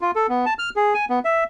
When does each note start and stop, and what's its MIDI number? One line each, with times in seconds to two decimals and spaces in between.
0.01 0.11 65
0.16 0.27 69
0.29 0.45 59
0.46 0.54 81
0.59 0.70 89
0.76 0.94 68
0.94 1.05 80
1.10 1.19 59
1.25 1.44 76